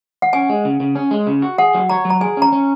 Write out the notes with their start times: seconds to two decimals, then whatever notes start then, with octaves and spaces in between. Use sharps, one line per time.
0.22 F#5
0.33 C#4 G#5
0.49 G#3
0.65 C#3
0.80 C#3
0.95 C#4
1.11 G#3
1.27 C#3
1.42 F#4
1.58 G#4 F#5
1.74 F#3
1.89 C#5 A#5
2.05 F#3
2.10 A#5
2.21 G#4 G#5
2.37 C#4 A#5
2.52 C#4